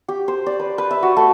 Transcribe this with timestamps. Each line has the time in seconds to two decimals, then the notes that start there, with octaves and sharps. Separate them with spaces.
0.08 G4
0.28 C5
0.46 D5
0.59 B4
0.78 B4
0.91 E5
1.03 F#4
1.17 A3